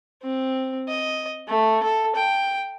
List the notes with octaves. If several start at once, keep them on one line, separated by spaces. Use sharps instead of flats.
C4
D#5
A3
A4
G5